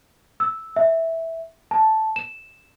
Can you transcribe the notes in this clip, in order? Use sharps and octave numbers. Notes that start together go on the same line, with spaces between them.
E6
E5
A5
E7